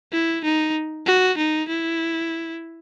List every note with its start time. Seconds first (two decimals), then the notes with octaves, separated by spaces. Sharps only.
0.12 E4
0.44 D#4
1.06 F#4
1.38 D#4
1.68 E4